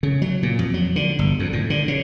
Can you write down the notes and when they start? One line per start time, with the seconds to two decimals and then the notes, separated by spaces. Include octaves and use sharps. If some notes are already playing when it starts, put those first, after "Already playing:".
0.03 C#3
0.22 F#3
0.43 A#2
0.59 F2
0.74 F#3
0.96 D3
1.19 G1
1.40 F2
1.53 A2
1.70 D3
1.88 C#3